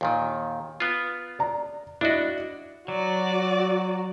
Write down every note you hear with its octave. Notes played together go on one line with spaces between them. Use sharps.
D#2 A#2 D#3
B3 F4
D5 A#5
D4 E4 F#4 D5 D#5
F#3 F#4 D5